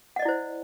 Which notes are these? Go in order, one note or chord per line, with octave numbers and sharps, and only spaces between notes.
E4 C5 D5 D#5 F#5